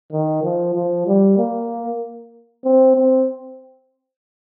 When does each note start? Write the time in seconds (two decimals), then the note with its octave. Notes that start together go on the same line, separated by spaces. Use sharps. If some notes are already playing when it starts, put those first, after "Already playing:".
0.12 D#3
0.43 F3
0.75 F3
1.07 G3
1.38 A#3
2.64 C4
2.97 C4